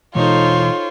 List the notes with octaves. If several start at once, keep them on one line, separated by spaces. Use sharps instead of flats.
B2 E3 G#3 D#4 F4 A4 C5 C#5